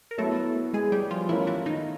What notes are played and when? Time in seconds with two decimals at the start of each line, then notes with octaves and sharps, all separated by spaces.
0.11 A#4
0.18 F#3 A3 B3 E4 A4
0.73 G#3 G#4
0.92 G3 G4
1.11 F3 F4
1.29 E3 A3 C#4 E4 F4 A#4
1.47 E3 E4
1.66 D#3 D#4